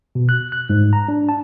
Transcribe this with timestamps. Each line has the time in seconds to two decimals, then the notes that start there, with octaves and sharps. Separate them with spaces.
0.15 B2
0.29 F#6
0.52 F#6
0.70 G#2
0.93 A#5
1.08 D4
1.29 A5